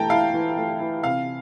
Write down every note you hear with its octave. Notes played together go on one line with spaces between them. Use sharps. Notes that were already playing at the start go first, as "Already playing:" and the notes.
Already playing: E3 A3 G5 A5 A#5
E4 F5
E3
A3
E3
C3 F5